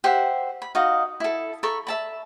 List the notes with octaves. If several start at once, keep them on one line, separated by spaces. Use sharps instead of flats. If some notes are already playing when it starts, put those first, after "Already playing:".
G4 C5 E5 F#5
B5
D#4 F#4 D#5 F5
E4 A4
A4 A#5 B5 C#6
E5 A5 B5